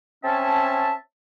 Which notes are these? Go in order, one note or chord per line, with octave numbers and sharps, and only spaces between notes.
C4 C#4 C#5 E5 A5